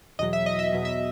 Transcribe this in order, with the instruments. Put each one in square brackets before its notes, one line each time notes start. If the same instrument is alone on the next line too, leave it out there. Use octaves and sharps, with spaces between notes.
[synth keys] E2 B2 F#3 D#5
E5
D#5
E5
E2 B2 F#3
E5